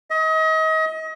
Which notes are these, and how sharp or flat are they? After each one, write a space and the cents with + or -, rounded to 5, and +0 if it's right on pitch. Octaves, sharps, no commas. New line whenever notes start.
D#5 +35